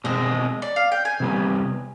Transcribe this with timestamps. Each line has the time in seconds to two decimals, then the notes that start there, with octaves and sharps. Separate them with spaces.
0.04 B2 G#3 C4 D#5
0.62 D5
0.76 F5
0.92 G5
1.05 G#5
1.20 C3 G3 B3